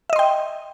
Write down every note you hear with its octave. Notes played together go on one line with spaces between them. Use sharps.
D#5 E5 G5 C6